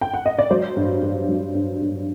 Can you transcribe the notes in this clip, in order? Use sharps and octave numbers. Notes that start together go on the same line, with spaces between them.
G5
F#5
D#5
D5
F#3 C5
G2
G2
F#3
G2
G2